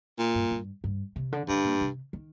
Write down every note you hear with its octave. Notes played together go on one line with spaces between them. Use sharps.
A#2
G2
G2
G2
C3
D3
G2 D3
A#2
C3
D#3